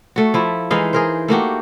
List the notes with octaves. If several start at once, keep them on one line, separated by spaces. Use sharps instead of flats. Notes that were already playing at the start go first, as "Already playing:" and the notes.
A3 F#4
F3 E4
E3 G#3 D#4 F5
G#4 A#4 C5
A3 A#3 F#4 G4